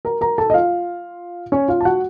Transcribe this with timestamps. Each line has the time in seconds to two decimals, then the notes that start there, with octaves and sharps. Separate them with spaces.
0.05 A#4 A#5
0.21 A#4 A#5
0.38 A4 A5
0.50 D#5
0.54 F4 F5
1.52 C#4 C#5
1.68 F4 F5
1.81 A5
1.85 F#4 F#5